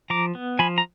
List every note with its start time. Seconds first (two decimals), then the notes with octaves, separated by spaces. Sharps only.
0.10 F3 A#5 D6
0.35 B3
0.59 F3 G#5 B5
0.78 A#5